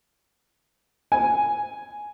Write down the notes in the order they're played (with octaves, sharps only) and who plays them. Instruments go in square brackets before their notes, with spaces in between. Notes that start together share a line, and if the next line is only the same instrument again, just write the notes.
[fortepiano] G#5